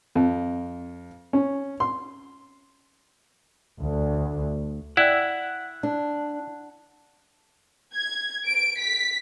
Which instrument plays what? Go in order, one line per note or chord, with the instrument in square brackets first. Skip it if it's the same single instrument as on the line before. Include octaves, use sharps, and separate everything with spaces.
[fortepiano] F2
C#4
C6
[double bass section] D2
[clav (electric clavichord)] E4 [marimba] D5 G5 E6 [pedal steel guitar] F#5
[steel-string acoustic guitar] D4
[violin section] G#6
D7
B6